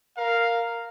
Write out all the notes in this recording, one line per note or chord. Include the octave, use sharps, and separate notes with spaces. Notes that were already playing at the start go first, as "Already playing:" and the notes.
A#4 F5